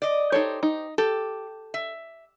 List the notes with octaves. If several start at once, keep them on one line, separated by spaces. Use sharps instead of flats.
D5 D#5
D#4 G4 A4 C5 C#5
D#4
G4 A4
E5